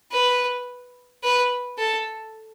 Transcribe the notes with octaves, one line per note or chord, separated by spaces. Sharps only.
B4
B4
A4